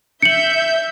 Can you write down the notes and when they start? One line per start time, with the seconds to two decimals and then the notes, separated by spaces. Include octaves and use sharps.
0.22 E5 G6 C#7 F#7